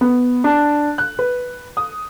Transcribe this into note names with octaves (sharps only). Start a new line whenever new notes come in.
B3
D4
F#6
B4
D#6